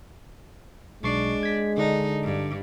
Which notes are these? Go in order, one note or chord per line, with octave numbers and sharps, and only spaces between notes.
B1 G#3 D4 C#6 C7
G#6 B6
D3 D4 D#4
G2